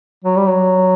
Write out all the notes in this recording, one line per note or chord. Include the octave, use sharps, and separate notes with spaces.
F#3
G3
F#3